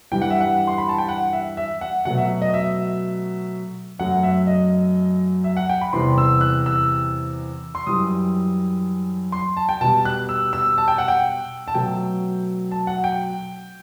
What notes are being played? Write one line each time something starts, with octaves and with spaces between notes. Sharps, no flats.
G2 E3 G3 G5
F#5
E5
F#5
C6
B5
A5
G5
F#5
E5
E5
F#5
B2 F#3 A3 F#5
E5
D#5
E5
F#2 F#3 A3 F#5
E5
D#5
E5
F#5
G5
B5
E2 C3 E3 G3 C6
E6
F#6
E6
C6
F#2 E3 G3 D#6
C6
A5
G5
B2 G3 A5
F#6
E6
E6
A5
G5
F#5
G5
A5
B2 F#3 A3 G5
A5
F#5
G5